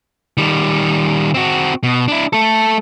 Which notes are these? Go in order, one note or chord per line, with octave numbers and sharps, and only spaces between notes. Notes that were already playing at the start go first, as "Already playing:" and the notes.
D#3 G3
C4 F#4
B2
D4 E4
A3 A4